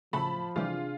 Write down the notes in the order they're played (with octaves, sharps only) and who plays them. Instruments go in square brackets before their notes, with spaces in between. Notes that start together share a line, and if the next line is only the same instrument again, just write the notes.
[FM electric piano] A2 [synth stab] C#3 F#3 A3 [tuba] F3 [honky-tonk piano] A5 B5
[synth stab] A2 E3 G3 [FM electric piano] C3 D4 G#4 [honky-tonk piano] F4